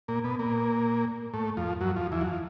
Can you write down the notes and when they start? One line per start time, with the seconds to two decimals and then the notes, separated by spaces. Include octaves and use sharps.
0.08 A#2 A#3
0.24 B2 B3
0.39 A#2 A#3
1.34 A2 A3
1.57 F2 F3
1.81 F#2 F#3
1.96 F2 F3
2.12 E2 E3
2.21 F#3
2.28 F3